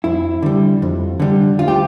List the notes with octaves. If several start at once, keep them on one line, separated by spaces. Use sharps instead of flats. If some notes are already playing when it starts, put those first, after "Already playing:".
F2 E4
D3 G3
F2
D3 G3
D2 F4
G4